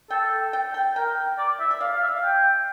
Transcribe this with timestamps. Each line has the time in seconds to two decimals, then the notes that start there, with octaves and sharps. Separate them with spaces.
0.10 A4 G5
0.53 G5
0.74 G5
0.96 A#4 G5
1.38 D5
1.60 E5
1.71 E5
1.81 D5 F5
1.92 F5
2.02 E5
2.13 F5
2.23 G5